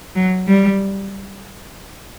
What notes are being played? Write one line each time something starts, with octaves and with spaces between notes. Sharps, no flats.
F#3
G3